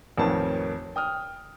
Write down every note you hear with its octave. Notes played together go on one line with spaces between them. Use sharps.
A1 F2 D#3 C4 C#5 A5
G5 D#6 F6